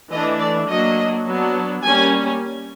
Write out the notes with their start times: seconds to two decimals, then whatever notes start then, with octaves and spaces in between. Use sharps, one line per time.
0.10 E3 A3 D4 D#5
0.40 D5
0.68 F#3 A#3 D4 D#5
1.26 F#3 B3 D4
1.83 G3 A#3 C#4 G#5